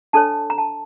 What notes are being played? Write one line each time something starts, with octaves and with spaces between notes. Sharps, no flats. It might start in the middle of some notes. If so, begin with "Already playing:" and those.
D4 A4 C#5 A5
A#5
A5